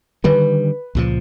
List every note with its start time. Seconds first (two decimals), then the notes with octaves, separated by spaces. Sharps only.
0.24 D3 D#3 G3 B4
0.95 C#2 A#2 F3